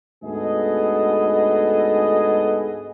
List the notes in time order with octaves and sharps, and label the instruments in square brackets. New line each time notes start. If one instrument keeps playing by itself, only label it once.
[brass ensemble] D2 G#2 B3 G#4 A4 D#5